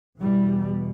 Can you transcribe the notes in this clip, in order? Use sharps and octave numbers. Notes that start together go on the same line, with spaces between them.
E2 B2 E3 G3